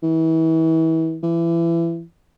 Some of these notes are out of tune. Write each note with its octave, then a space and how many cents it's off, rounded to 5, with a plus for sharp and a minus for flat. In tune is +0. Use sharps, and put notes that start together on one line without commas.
E3 -35
E3 +25